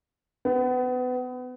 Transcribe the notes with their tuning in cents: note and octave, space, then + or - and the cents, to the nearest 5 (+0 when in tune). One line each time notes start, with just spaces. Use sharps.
B3 +30